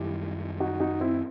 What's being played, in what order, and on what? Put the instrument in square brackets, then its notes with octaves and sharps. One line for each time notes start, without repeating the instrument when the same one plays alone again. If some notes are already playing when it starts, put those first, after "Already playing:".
Already playing: [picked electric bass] F#2 D#3 G3 [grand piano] E4 G4
[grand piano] D#4 F#4
D#4 F#4
C4 E4